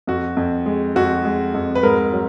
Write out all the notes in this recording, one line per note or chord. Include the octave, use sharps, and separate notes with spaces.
F2 F#4
F2
G#3
F2 F#4
G#3
F2
B4
G#2 A#4
F#3